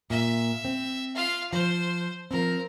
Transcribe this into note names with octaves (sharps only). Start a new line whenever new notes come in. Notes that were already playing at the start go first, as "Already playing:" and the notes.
A#2 E5
C4
F4 F5
F3 C5
F3 C4 A#4